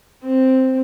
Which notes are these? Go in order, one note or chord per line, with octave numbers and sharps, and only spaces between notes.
C4